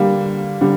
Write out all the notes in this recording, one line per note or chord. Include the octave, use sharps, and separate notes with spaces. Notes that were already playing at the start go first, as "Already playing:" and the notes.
Already playing: D3 G3 A#3
D3 G3